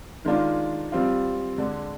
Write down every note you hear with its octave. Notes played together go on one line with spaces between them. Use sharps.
D#3 G#3 D4 F4
G3 C4 F4
D3 G#3 D4